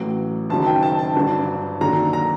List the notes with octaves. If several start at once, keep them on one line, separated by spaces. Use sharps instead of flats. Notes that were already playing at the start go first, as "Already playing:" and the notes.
Already playing: A1 A2 F#3
F#1 F#2 D#3 F#3 A5
G5
A5
A5
G1 G2 F#3
D#2 D3 F#3 A#5
A#5